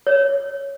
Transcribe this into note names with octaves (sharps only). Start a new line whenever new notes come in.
C#5